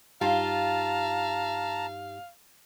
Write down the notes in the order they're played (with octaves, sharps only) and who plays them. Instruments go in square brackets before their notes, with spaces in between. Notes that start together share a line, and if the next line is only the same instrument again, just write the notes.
[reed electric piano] G2 D#4 G4 [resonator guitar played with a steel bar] F4 [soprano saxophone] F5 [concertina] A5 A#5